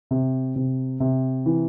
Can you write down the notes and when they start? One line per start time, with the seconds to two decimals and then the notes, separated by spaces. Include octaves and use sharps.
0.11 C3
0.56 C3
1.00 C3
1.46 E3